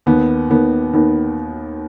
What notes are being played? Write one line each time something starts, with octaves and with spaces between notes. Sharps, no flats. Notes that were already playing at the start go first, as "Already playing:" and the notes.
D#2 D#3 B3
D#2 D#3 B3
D#2 D#3 B3